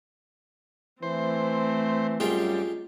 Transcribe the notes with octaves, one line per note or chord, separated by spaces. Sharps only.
E3 A3 C4 C5
F#2 G3 G#3 F4 G4